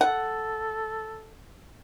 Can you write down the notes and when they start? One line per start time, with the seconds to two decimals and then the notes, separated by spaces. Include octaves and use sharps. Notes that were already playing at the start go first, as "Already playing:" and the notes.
0.01 A4 F#5